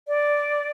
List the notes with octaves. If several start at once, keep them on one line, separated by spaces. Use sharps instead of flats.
D5